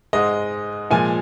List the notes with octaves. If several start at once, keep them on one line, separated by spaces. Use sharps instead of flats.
G#2 G#3 D#5
A#2 F3 G#3 G#5